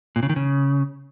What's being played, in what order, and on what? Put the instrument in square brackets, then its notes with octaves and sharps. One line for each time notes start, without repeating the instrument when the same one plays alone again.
[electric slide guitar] A#2
C#3
D#3
C#3